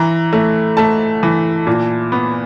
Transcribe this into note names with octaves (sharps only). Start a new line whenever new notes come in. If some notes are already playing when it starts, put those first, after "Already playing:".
Already playing: E3 A#5
A3
A3 A5
E3
A#2
B3